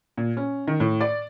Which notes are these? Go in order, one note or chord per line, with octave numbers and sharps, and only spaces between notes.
A#2
C#4
D#3
A2
D5